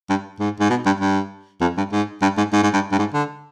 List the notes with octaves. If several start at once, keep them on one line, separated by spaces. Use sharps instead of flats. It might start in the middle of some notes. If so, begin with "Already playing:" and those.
G2
G#2
G#2
B2
G2
G2
F2
G2
G#2
G2
G#2
G#2
G#2
G2
G2
G#2
D3